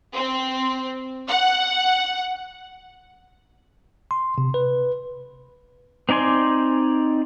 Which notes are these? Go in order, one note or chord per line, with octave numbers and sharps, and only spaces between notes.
C4
F#5
C6
C3
B4
C4 D#4 D5 G#5 C6